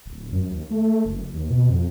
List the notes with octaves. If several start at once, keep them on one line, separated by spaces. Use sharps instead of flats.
D1
F#2
D#2
A3
F#1
D#2
B2
F2